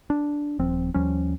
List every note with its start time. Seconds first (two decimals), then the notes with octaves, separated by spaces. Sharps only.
0.10 D4
0.59 D#1 F3 C4
0.94 D#2 F3 G3 C#4